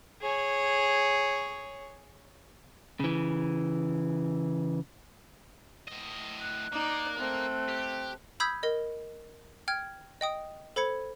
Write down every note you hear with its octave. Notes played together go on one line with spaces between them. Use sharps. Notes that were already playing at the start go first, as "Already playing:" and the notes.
G#4 C#5
C#3 E3
A2 D#5
F#6
A#3 D#4 D5
A3 C4
G4
B5 D#6 E6 G6 G#6 B6
A#4 D#5
G5 F6 G#6
D#5 G5 D#6
A4 C5 B5 G#6 C#7